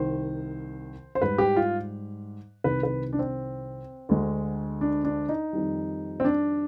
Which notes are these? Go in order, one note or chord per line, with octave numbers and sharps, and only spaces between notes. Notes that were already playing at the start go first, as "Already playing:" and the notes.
Already playing: C2 C3 D#3 C5
C5
G#2 G3 B4
G4
F4
C2 C3 D#3 B4
B4
D4
C4
D2 D3 G#3
D4
D4
D#4
F2 D#3 G3
C4
D4